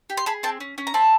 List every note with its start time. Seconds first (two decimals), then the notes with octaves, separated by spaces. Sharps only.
0.10 G4
0.17 C6
0.26 G#4 A5 B5
0.43 C4 G5 A5
0.60 C#4
0.78 C#4
0.87 A#5
0.94 C4 A5 B5